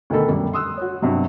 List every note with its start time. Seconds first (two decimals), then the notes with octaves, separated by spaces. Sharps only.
0.10 D2 B2 D#3 A4 B5
0.28 F#2 G3
0.53 C6 D#6 E6 F#6
0.77 F#4 C#5
1.02 G2 C3 F#3